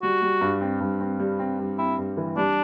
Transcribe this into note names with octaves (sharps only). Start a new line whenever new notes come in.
G3 F#4
G3
G2
C4
G2
C4
G3
C4
G2
C4 E4
G2
E3
G3 D4